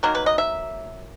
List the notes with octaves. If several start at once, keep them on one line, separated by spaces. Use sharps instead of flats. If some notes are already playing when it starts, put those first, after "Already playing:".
D#3 F#3 A#3 A#4
B4
D#5
E5